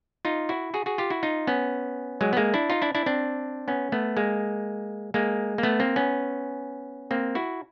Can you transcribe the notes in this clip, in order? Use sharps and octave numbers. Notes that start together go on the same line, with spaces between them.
D#4 F4
E4 F#4
F#4 G#4
F#4 G#4
F4 G4
E4 F#4
D#4 F4
B3 C#4
F#3 G#3
B3
G#3 A#3
D4 E4
D#4 F4
D4 E4
D4 E4
C4 D4
B3 C#4
A3 B3
G#3 A#3
G#3 A#3
A#3
A3 B3
A#3 C4
B3 C#4
A#3 C4
E4 F#4